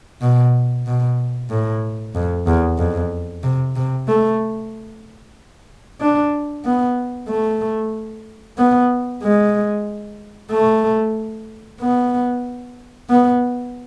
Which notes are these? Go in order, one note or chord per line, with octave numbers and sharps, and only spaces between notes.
B2
B2
A2
F2
E2
F2
C3
C3
A3
D4
B3
A3
B3
G#3
A3
B3
B3